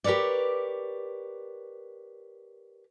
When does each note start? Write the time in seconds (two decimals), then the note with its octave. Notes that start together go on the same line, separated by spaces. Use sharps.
0.04 G4 A#4 B4 C#5 D5